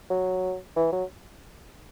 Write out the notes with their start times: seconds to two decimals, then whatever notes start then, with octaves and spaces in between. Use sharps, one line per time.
0.10 F#3
0.76 E3
0.92 F#3